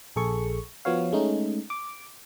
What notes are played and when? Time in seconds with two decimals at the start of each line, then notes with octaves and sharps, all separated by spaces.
0.16 A#1 G#4 A4 C#6
0.85 F3 B3 F#4 C#5 F5
1.13 G#3 A3 C#4 D#4
1.70 D6